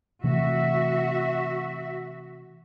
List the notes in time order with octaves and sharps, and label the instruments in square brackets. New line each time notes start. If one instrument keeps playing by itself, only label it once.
[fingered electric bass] C3 E3 A3 [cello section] F#4 E5